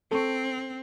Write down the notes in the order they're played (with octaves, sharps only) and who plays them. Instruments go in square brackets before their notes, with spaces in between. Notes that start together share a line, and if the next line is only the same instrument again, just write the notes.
[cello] C4 [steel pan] A4 C#6